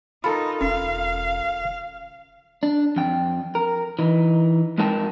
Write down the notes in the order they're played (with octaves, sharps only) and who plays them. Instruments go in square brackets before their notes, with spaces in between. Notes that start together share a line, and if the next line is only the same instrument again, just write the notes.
[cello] D#4 [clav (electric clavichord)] F4 A4 A#4 [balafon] B5
[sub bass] E1 [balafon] C#4 [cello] F5
[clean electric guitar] D4
F2 G5
A#4
E3 D#4
F2 G#3 D#4 A#4 G5 A5